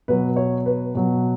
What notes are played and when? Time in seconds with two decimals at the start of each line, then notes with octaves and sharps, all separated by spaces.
0.08 B2 F#3 B4
0.36 C#5
0.66 B4
0.95 B2 F#3